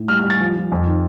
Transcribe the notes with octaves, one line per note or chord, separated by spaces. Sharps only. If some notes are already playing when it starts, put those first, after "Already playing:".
Already playing: A2
G3 F6
F6
G3
A6
F3
F3
F2
D#3